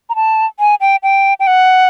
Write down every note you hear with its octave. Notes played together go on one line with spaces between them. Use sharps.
A#5
A5
G#5
G5
G5
G5
F#5